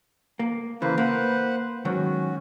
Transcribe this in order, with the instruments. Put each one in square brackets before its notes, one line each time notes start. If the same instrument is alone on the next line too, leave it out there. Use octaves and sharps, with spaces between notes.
[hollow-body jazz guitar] A#3
[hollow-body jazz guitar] C#3 E3 [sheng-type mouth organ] A#3 B4 C5
[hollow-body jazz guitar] A#3 [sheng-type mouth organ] B4 C5 F#5
[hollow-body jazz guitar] G#2 D#3 F#3 [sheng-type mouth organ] C#4 F#4